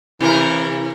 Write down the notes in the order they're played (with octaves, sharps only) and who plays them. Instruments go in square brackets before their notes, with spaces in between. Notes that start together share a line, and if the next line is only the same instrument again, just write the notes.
[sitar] C3 A#4 [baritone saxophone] E3